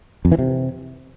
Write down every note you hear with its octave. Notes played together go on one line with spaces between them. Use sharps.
F2
E3
C3